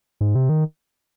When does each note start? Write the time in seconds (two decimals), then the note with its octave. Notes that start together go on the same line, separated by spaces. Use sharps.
0.21 G#2
0.35 C3
0.49 D#3